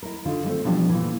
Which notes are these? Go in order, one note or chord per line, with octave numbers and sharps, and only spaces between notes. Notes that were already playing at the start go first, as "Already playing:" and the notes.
E4 A#4
D3 D#3 F4
G3 A3 C4
B2 E3 F3 G3 D4 G4
A#2 E3